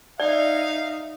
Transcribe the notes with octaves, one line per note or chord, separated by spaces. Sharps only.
D#4 D5 E5 F5